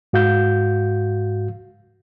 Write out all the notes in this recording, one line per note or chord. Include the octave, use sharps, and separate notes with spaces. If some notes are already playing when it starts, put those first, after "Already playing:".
G#2 F#4 F5 G6